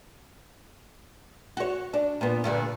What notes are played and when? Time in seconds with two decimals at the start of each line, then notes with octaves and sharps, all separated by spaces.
1.57 F#4 C#5
1.94 D4
2.21 A#2 B3
2.44 G2 A#2 D3